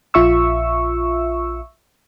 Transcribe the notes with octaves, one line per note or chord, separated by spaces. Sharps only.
A#1 F4 E5 C#6 E6